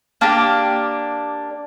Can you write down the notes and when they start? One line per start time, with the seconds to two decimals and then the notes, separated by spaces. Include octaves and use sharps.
0.21 A#3 D4 G4